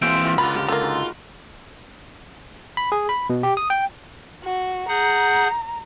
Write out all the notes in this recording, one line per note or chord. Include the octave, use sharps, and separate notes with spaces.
E3 G#3 A#3 C4 F#4 E5 F5 G5
F4 F#4 C5
C#2 D3 F4 A#4 B4 F#5 B5
G4 F5
A3 A#3 F4
G#3 D#4 F#4
B5
G#4
B5
B2
G4
D#6
G5
F#4
G#4 F#5 A#5 G6